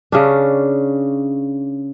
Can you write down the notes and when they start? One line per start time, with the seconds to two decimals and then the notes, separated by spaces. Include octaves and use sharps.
0.12 C#3 C#4 D4